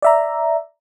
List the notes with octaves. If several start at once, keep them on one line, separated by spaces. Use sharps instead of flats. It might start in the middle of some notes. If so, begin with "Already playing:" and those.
D5 E5 A#5